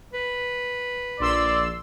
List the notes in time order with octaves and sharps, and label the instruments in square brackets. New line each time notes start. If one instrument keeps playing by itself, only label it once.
[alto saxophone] B4
[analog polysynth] A#1 C6 E6 [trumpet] D5